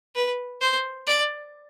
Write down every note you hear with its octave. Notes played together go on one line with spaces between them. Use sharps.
B4
C5
D5